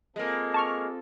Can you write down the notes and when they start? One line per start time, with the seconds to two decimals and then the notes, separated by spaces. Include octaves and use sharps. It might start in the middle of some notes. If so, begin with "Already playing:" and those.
0.16 G#3 A#3 C4 F4 A4
0.54 A5 C#6 F6